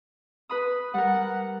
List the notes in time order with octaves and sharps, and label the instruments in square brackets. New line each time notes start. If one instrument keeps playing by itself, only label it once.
[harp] B4 B5 D#6
[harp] G3 A#4 [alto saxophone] F#5